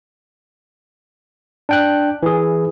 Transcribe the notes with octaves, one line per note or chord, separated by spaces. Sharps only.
D4 G5 F#6
E3 G#4